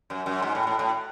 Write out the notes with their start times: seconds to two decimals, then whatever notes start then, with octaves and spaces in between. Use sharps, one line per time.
0.10 F#2
0.26 F#2
0.42 G#2
0.55 A2
0.67 A2
0.79 A2